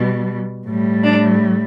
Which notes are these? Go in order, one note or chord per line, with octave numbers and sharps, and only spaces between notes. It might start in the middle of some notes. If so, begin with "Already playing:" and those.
Already playing: B2 G3
A2 G3
D4